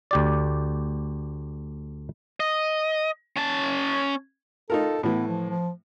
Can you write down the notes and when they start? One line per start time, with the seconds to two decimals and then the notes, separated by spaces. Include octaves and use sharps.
0.11 D2 G4 D5
2.40 D#5
3.36 C#4 A5
4.70 D#4 F4 A4 A#4
5.03 A2 E3 B3
5.28 F3
5.50 F3